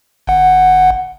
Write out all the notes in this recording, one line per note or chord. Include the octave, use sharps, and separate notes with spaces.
G1 F#5